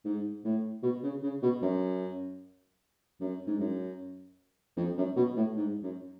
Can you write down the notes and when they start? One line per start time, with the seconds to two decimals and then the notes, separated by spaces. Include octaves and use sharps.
0.05 G#2
0.44 A2
0.83 B2
1.03 C#3
1.23 C#3
1.42 B2
1.62 F#2
3.20 F#2
3.47 G#2
3.59 F#2
4.77 F2
4.97 F#2
5.16 B2
5.36 A2
5.56 G#2
5.83 F#2